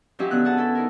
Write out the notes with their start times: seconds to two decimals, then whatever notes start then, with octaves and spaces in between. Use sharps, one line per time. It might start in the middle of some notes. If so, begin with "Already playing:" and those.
0.19 F3 F#3 C#4 G4 D#5 E5
0.31 D3 B3 F#6
0.45 G#4 F#5 A5
0.57 C#4 E4 A4
0.75 D#4 E4 A#4